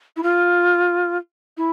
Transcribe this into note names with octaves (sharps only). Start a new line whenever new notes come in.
E4
F4
E4